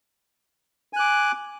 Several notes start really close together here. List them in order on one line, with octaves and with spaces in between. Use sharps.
G#5 F#6 D6